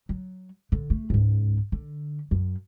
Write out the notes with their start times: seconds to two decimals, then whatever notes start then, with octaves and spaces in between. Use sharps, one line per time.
0.09 F#3
0.72 D3
0.90 A3
1.10 C#2 G#2
1.72 D3
2.31 F#2